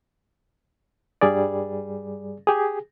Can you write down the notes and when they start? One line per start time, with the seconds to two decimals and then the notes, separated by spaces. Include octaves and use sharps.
1.21 G2 G3 G#4 D5
2.47 G4 G#4